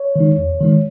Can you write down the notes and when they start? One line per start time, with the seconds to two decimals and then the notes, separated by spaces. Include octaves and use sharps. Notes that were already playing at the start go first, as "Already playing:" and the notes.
Already playing: C#5
0.16 D#3 G#3 D#4
0.38 E2
0.61 D#3 G#3 D#4